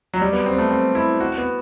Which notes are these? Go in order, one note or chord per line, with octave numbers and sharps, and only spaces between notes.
F#3
G3
B3
C4
B3
A3
C4
E4
F#4
B3